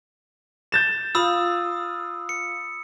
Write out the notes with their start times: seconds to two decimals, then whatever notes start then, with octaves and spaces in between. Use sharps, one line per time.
0.72 G6 A6 E7
1.15 F4 B5 D#6 E6
2.29 C#7